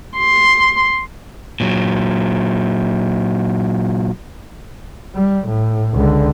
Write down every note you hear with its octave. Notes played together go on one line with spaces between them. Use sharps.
C6
A#2 F#3
G3
A2
C#2 D3